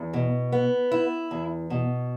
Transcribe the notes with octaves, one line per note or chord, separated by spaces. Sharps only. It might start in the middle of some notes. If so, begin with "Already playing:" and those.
Already playing: E2
B2
B3
E4
E2
B2